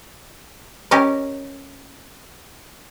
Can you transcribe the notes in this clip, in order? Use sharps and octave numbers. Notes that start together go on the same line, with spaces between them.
C#4 G4 A#4 D#5